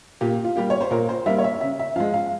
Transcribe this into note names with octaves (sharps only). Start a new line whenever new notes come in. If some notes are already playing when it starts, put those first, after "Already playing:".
A#2 G4
F4
G3 A#3 G4
C#5
C5
A#2 A#4
C5
G3 A#3 E5
C#5
E5
C#3 E5
E5
F3 G#3 F5
F5